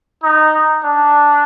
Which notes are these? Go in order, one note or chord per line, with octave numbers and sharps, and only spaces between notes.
D#4
D4